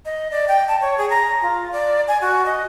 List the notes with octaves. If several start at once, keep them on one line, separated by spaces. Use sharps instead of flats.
D#5
D5
G5
A5
C#5
G#4
A#5
F4
D5
G#5
F#4
D#5